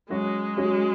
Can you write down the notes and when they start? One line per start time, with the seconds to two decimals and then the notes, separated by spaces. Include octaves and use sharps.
0.10 F#3 G#3 C#4 F#4
0.57 F#3 C#4 F#4